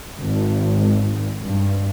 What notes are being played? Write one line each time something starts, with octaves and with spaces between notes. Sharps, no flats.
G#1
G2